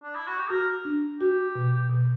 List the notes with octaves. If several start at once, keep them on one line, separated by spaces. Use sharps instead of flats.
D4
E4
F#4
G4
F#4 A#4
D4
F#4 G4
B2
B2